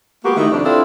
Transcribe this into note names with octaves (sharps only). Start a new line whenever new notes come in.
G#3 A#3 B3 F#4 G4
D#3 A3 D#4 E4
F2 C3 D4
C4 D4 E4 F4 A4